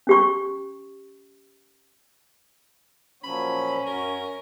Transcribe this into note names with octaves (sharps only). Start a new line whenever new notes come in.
C#4 G4 C#6
A#2 F3 F#3 C#4 B5
F#2 F#4 A#4